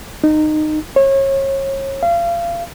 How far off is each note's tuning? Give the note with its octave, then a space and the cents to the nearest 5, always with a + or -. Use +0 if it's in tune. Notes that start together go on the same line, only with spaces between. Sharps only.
D#4 -20
C#5 -30
F5 -30